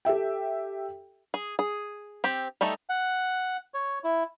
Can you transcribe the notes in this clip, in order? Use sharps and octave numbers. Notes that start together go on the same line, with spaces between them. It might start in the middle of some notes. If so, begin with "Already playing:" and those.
G4 A4 E5 G5
G#4
G#4
C4 G4
G3 A3 D#4 A4
F#5
C#5
E4